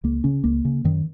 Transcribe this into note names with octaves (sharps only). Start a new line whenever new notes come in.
C#2 A#3
C#3 C#4
C#2 A#3
C#3
F#2 D#3